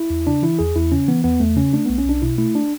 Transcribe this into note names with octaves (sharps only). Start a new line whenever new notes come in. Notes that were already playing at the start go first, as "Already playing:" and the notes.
Already playing: E4
E2
C#3 D4
E3 E4
E2 G#4
E2 E4
C#3 C#4
E3 B3
E2 B3
E2 A3
C#3 C#4
A3 D4
B1 B3
C#4
B1 D4
B2 E4
A3 E4
D4